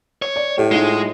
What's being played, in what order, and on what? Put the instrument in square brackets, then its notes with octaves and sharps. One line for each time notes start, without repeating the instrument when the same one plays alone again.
[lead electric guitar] C#5
[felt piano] D5
[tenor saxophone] A2 [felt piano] G4
[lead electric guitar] G#3 [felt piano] D#4 F4